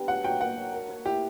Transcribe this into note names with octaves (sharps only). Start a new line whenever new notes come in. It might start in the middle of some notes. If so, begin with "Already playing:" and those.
Already playing: G3 B3 D4
F#3 F#5
F#3 G5
A#3 F#5
F#3
A#4
C#5
E4 G4